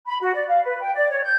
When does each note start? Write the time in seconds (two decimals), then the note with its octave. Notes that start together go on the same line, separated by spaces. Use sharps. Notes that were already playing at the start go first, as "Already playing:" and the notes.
0.07 B5
0.21 F#4
0.34 D5
0.48 F5
0.65 B4
0.82 G5
0.94 D5
1.10 C#5
1.23 G6